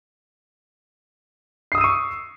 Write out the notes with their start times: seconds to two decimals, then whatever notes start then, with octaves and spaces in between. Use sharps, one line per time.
1.72 C7
1.75 D#6
1.78 E6
1.81 D#7
1.84 C#6